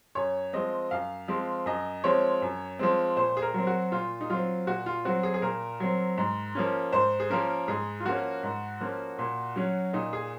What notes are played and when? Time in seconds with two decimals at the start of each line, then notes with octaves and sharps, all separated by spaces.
0.15 F#2 C#5
0.53 F3 G#3 C4 D#5
0.91 F#2 F5
1.28 F3 G#3 C4
1.66 F#2 D#5
2.04 F3 G#3 C4 C#5
2.42 F#2
2.79 F3 G#3 C4
3.17 A#2 C5
3.37 G#4
3.42 A#4
3.54 F#3 C4
3.67 F#4
3.92 A#2 F4
4.21 D#4
4.30 F#3 C4 F4
4.67 A#2 F#4
4.86 F4
5.05 F#3 C4 F#4
5.23 G#4
5.34 G#4
5.42 A#2 A#4
5.80 F#3 C4
6.18 G#2
6.55 F3 A#3 C#4
6.93 G#2 C5
7.20 G#4
7.30 F3 A#3 C#4 A#4
7.68 G#2 G#4
8.00 F4
8.05 F3 A#3 C#4 F#4
8.43 G#2
8.80 F3 A#3 C#4
9.18 A#2
9.56 F#3 C#4
9.93 A#2 D#4
10.13 G#4